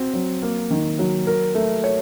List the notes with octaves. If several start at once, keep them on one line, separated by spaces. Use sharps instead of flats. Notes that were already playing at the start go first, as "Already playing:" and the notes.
Already playing: C4 F#4
F#3
A#3
D#3
F#3
A#4
A3
C#5